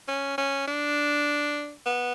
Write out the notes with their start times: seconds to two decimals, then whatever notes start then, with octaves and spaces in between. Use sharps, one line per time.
0.09 C#4
0.38 C#4
0.68 D4
1.86 B3